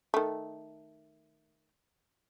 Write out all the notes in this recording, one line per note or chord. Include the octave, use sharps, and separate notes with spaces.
D#3 A3